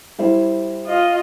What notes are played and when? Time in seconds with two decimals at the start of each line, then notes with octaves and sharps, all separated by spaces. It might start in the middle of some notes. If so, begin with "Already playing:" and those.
0.19 G3 E4 C5
0.87 F4 D#5